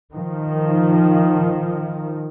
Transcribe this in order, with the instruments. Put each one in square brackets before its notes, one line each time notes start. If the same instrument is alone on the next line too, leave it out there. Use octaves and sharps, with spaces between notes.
[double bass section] D#3 F3